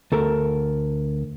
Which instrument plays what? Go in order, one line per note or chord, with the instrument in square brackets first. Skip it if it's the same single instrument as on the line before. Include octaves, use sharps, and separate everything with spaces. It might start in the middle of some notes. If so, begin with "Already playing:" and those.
[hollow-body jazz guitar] D2 A4 A#4